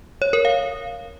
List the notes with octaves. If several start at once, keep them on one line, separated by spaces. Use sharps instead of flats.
C#5
A#4
F5